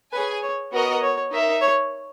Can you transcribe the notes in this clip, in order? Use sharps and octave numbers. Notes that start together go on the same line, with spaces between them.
G#4 B4 C#5 G#5
C#5
B3 F#4 A#4 D#5 F#5
C#5
D#4 A#4 E5
C#5